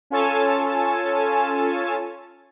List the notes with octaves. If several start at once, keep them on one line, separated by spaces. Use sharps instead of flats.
C#4 F4 A4 C#5 G#5 A5